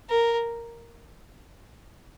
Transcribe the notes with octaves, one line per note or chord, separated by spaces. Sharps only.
A#4